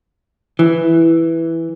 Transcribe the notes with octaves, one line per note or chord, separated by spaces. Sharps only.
E3